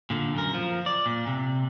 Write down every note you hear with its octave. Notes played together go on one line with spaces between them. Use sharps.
A#2 D3
F#2 A#4
F3
D5
A#2
C3